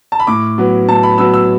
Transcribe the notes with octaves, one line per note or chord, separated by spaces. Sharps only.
A5
B5
A2 D6
F#3 B3
A2 A5
B5
F#3 B3 E6
E6